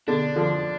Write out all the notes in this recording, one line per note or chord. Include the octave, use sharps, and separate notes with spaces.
B2 D3 D4
D3 F3